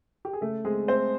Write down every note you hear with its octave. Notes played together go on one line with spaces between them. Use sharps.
G4
G#4
C#3 A3 A4
G#3 C4 G#4
A3 C4 C5